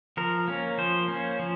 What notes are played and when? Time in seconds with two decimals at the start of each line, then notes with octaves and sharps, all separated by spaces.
0.17 F3 A#4
0.48 A#3 C#4
0.78 F3 C5
1.08 A#3 C#4
1.39 F3